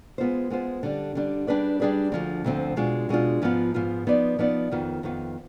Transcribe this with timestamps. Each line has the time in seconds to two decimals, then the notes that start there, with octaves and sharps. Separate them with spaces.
0.18 G#3 B3 F4 C5
0.50 G#3 B3 F4 C5
0.83 D3 G3 D4
1.15 D3 G3 D4
1.47 G3 D4 G#4 B4 D5
1.80 G3 D4 G#4 B4 D5
2.12 D2 D3 F3 C4
2.44 D2 D3 F3 C4
2.76 B2 G#3 D4 F4
3.09 B2 G#3 D4 F4
3.42 G#2 F3 B3 F4
3.74 G#2 F3 B3 F4
4.07 F3 B3 D#4 B4 D5
4.39 F3 B3 D#4 B4 D5
4.72 F2 D#3 B3 F4
5.03 F2 D#3 B3 F4